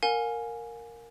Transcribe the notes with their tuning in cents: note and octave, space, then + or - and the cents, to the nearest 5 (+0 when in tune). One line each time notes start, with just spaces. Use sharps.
A#4 -5 F5 +45 G#5 +0